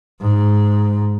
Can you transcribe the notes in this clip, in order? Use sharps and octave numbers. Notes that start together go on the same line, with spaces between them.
G#2